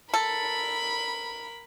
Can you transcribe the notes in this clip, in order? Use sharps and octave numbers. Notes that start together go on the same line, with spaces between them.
A4 A#4 B5